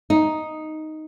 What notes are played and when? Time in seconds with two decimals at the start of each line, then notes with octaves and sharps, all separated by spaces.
0.10 D#4